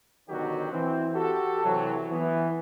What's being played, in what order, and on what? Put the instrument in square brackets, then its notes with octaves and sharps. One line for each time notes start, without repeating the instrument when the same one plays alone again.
[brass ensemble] B2 D3 D#3 F#3 F#4 G4
E3 C4
F#4 G4 A4
C3 E3 F#3
E3 B3